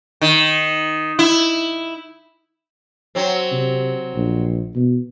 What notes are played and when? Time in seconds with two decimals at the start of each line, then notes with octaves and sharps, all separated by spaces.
0.21 D#3
1.19 E4
3.15 F#3 C4
3.52 C3
4.15 A#1
4.75 B2